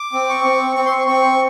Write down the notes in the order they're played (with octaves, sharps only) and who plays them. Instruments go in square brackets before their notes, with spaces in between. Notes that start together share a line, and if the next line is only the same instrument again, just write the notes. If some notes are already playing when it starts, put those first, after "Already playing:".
Already playing: [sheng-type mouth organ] D6
C4
C#6
C4
C4 C#6
C6
C#6
C4 C#6